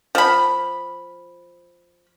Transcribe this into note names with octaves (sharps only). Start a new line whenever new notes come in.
F3 B5